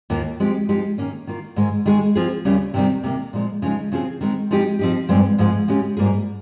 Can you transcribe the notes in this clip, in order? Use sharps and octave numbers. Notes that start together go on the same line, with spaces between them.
D#2 D#3 A#3 F4
F3 G#3 C4 G4
F3 G#3 D#4 G4
D#3 A#3 C#4
D#3 A#3 F4
G#2 D#3 G#3
D#3 G#3 D#4 G#4
F3 C4 F4 G#4
D#2 C#3 G3 C#4
C3 D#3 G3 C4
C3 D#3 A#3
A#2 F3 G#3
C#3 F3 G#3 D#4
C#3 F3 C4 F4 G#4
D#3 G#3 C4
F3 G#3 C4 D#4 G4
F3 C4 D#4 G4
G2 F3 G#3 C4
G#2 F3 G#3
C#3 G#3 C#4 G4
G#2 G3 A#3 F4 G#4